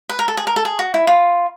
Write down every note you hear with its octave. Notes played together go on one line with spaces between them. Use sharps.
B4
A#4
A4
G#4
A#4
A4
G#4
F#4
E4
F4